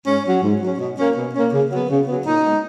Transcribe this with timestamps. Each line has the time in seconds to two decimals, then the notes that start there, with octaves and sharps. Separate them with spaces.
0.06 G#2 C#4
0.25 F#3 C#4
0.43 G#2
0.61 F#3 C#4
0.79 B2
0.98 A#3 C#4
1.16 B2
1.34 A#3 C#4
1.53 C#3
1.71 F#3 B3
1.90 C#3
2.07 F#3 B3
2.25 A#2 D#4
2.44 G#3 B3